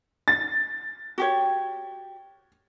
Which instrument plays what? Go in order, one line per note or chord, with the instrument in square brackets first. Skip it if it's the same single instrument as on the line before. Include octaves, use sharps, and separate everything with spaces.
[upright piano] A6
[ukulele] F#4 G4 C#5